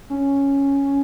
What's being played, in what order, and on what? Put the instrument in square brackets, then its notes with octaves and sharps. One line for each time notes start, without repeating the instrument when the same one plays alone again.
[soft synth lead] C#4